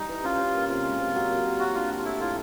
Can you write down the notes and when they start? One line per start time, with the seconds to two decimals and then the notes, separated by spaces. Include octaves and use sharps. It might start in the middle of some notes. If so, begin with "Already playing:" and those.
Already playing: G3 D#4
0.09 E3
0.24 C#4 F4
0.39 C#4
0.54 A#3
0.69 C3 F4
0.84 G#3
0.99 C3
1.15 F#3
1.29 A#3
1.45 A#3
1.60 F#4 G4
1.74 D4 F4
1.90 G4
1.98 F4
2.05 A2 E4
2.20 A2 F4